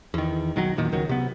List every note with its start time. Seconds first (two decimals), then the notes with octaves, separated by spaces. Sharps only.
0.14 E2 D#3
0.56 B1 D#3 F#3
0.77 E1 A#2 D#3
0.92 C#2 D#3 F#3
1.09 C3 B3